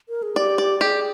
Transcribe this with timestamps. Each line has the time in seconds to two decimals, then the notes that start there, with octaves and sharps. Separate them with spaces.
0.09 A#4
0.23 G#4
0.36 G4 D5
0.58 D5
0.81 G4 G#4